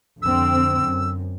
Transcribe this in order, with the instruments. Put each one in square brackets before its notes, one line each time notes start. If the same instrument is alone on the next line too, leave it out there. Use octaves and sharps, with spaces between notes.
[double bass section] F2 D3 C4 [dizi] E6
[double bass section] F#2